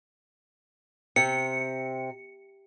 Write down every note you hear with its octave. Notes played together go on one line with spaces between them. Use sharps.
C3 C#7